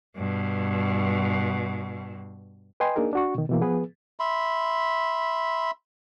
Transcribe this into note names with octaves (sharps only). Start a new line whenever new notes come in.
G2 B2
B4 D#5 G5 G#5 C6
A#3 D4 D#4 G#4 A#4
D4 F#4 C#6
B2 D#3
B2 E3 A#3
F3 B3 G#4 B4
E5 B5 C6